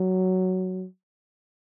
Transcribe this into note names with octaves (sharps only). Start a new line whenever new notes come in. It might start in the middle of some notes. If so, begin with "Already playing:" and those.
Already playing: F#3